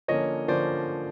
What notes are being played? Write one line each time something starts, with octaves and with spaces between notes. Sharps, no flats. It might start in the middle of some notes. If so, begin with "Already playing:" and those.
D3 F3 A#3 C#4 C#5 D#5
D3 F3 A#3 C#4 C5 D5